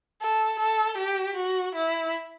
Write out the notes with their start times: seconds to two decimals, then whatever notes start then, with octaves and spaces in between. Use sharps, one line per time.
0.21 A4
0.59 A4
0.98 G4
1.36 F#4
1.75 E4